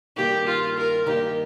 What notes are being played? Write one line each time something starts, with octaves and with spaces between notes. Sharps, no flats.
G2 D#3 A#3 D#4 G4
F4
A#4
G2 D#3 A#3 D#4 G4